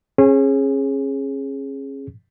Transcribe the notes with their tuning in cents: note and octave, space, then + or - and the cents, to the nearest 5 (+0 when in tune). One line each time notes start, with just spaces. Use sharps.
C#4 -30 G#4 +0